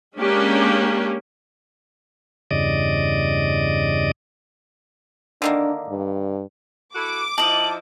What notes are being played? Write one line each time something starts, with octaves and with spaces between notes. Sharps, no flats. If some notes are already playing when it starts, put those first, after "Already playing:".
G#3 A#3 C#4 D4 G4
E2 G2 C#3 D5 D#5
D3 D#3 A#3 D4
G2
E4 F#4 A4 D6
F3 D#4 E4 D#5 A5 F#7